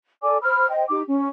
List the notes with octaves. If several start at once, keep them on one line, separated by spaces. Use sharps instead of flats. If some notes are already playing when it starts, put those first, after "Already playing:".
A4 D5 G#5 D6
C5 B5 E6 F6
C5 D#5 G5
D#4 G4 D6
C#4